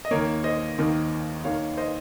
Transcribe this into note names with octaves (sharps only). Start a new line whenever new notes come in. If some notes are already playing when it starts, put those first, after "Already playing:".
D#5
D#2 D#3 A#3 A#4 C#5
C5 D#5
D#2 D#3 A#3
D#2 D#3 A#3 C#5 F5
C5 D#5